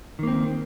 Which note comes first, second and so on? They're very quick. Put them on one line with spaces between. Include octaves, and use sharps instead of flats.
D#3 A#3 C4